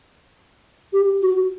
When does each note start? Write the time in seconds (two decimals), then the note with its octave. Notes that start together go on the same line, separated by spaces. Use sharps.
0.92 G4
1.22 F#4